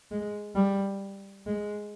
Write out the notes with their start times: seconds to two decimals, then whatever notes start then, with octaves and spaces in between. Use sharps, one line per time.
0.11 G#3
0.55 G3
1.46 G#3